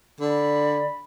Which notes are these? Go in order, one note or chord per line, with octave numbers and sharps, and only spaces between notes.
D3 D5 B5